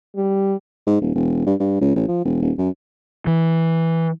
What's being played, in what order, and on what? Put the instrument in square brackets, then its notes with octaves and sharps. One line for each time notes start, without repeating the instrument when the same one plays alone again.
[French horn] G3
[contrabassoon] G#2
D#1
E1
G2
G2
C#2
A1
F3
E1
D#1
F#2
[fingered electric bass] E3